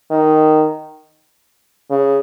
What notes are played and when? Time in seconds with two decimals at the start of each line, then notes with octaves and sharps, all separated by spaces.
0.11 D#3
1.90 C#3